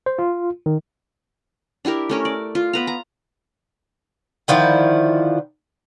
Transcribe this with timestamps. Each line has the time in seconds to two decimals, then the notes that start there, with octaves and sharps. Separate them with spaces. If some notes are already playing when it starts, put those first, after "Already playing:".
0.06 C5
0.19 F4
0.66 D#3
1.85 D4 E4 G4 A#4
2.09 A3 C#4 A#4
2.25 D5
2.55 F4
2.73 B3 B4 A#5
2.87 A#5
4.48 D3 D#3 F3 E4